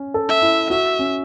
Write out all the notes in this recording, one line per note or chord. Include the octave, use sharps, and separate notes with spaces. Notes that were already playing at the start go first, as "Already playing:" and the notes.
Already playing: C#4
A4
E5
E4
F#4 E5
C#4